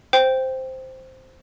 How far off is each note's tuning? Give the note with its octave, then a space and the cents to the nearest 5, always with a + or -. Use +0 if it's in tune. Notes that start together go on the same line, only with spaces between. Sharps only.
C5 +0 G5 +0